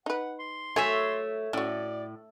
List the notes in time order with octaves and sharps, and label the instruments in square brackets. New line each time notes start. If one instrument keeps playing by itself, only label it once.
[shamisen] D#4 B4 [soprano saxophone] F#5
[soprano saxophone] C6
[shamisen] F#3 G#5 [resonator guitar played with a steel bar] A3 [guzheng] C#5 E5
[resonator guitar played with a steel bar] A2 [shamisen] C#4 F#4 [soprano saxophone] D5